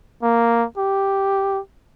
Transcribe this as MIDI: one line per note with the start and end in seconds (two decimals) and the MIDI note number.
0.23 0.65 58
0.77 1.60 67